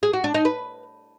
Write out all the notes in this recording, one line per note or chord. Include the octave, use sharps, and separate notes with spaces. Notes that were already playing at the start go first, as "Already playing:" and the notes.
G#4
F#4
D4
D#4
B4